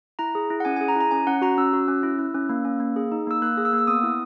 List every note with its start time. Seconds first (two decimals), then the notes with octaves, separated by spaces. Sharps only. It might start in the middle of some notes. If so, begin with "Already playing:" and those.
0.19 E4 A#5
0.35 G#4
0.50 E4
0.60 F#5
0.65 C#4 G#5
0.76 G#4 G#5
0.88 A#5
0.95 E4
1.01 A#5
1.11 C#4 G#5
1.27 C#4 F#5
1.42 F#4 A#5
1.58 C#4 E6
1.73 F#4
1.88 C#4
2.03 E4
2.19 E4
2.35 C#4
2.49 A#3
2.65 C#4
2.80 A#3
2.96 G#4
3.12 D#4
3.27 A#3 E6
3.42 A#3 F#6
3.58 G#4
3.65 E6
3.73 A#3
3.78 E6
3.87 B3 D#6
4.03 E4